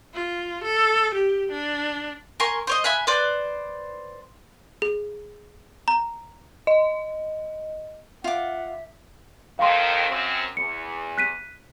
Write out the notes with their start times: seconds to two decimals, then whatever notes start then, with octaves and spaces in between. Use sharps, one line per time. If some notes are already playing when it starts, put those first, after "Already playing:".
0.14 F4
0.64 A4
1.14 G4
1.51 D4
2.40 A#4 G#5 C6 C#6
2.67 C5 C#5 D#5
2.84 E5 G#5 B5 F#6
3.07 B4 C5 D5
4.82 G#4
5.88 A#5
6.67 D#5
8.24 F4 E5 F#5 D6
9.59 F2 D#3 F5 C6
10.09 F#2 C4
10.57 E2 C#7
11.18 F#6 B6 D#7